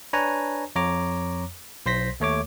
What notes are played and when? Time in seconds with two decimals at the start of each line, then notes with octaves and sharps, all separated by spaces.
0.13 D4 B4 C#5 G#5 A#5
0.76 F2 C#5 A#5 D6
1.86 B1 C5 C6 A#6 B6
2.20 D#2 A3 C#5 D6